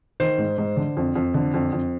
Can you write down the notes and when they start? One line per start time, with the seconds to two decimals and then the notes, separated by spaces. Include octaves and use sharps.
0.20 D#3 C5
0.38 G#2
0.58 G#2
0.76 D3
0.97 F2
1.16 F2
1.34 D3
1.54 F2
1.73 F2